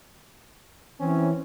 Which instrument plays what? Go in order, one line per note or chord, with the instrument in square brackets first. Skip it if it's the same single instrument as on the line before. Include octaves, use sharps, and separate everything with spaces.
[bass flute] E3 [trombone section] C4 C#4